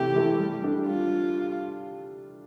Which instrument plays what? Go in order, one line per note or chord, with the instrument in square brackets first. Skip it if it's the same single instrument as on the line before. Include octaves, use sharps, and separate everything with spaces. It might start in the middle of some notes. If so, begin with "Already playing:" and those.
Already playing: [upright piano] C3 E3 A3 E4 [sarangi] G4
[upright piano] E3 A3 E4 A4
G3
D4 A4
[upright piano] G3 [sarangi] F4